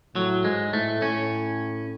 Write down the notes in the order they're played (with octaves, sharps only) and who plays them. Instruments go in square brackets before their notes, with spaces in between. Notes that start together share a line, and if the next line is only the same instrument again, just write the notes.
[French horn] A2 [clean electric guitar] F#3
[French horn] G#2 [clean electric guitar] G#3
[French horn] A2 [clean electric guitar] A3
[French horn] A2 [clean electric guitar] C#4